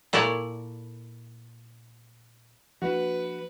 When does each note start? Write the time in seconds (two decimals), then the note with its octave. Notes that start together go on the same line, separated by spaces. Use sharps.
0.13 A#2 E4 A4 C#5 D5
2.82 F3 A#3 D4 F#4 B4